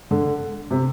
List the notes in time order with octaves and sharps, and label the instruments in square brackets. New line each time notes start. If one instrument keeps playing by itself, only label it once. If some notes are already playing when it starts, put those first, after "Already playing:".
[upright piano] D3
C3